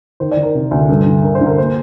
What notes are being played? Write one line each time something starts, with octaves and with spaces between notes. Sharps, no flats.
D#3 C5
D5
D#3
A#4
C3
D2
G2 A4
D3
D3 A#4
C5
D3
A#4
A#3 C5